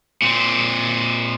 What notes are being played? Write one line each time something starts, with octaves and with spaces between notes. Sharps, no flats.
A#2 C4